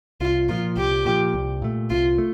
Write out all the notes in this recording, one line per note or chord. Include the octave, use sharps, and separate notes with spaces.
C2 F4
A#2 F3 F4
C2 G4
A#2 F3
C2
A#2 A3
C2 F4
A3